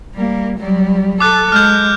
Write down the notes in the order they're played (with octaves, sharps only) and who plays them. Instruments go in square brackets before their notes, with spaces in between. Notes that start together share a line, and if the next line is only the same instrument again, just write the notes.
[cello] G3 A#3
F#3 G3
[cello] A4 [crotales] D6 F#6
[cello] G#3 [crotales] F6 G6